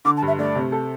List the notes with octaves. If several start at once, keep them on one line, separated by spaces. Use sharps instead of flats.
D3 D6
A5
G2 E5
A3 D5
C3
A4